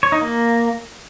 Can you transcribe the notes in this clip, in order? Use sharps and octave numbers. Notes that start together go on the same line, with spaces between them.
C#5
D#4
A#3